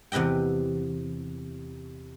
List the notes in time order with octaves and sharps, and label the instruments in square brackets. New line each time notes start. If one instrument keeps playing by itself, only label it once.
[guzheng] E2 C3 B4 D#5 G5